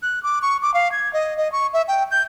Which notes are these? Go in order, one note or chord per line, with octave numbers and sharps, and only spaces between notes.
F#6
D6
C#6
D6
F5
G#6
D#5
D#5
C#6
E5
G5
G6